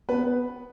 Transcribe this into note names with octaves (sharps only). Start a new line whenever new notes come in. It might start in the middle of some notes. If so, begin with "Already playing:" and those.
B3 B4